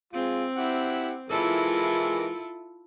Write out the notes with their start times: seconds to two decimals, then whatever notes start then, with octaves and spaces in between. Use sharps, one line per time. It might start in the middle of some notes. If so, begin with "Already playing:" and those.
0.13 G#3 C4 F4
0.57 E4 G4 F#5
1.30 E3 G#3 E4 F4 A4 A#4